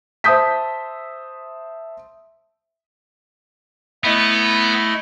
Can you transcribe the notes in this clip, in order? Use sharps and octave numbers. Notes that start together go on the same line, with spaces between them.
C5 E5 A5 D#6 G6 B6
A3 B3 E4 D#5